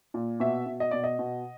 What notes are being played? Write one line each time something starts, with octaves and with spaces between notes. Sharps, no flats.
A#2
B2 E5
B2
D#5
B2 D5
D#5
B2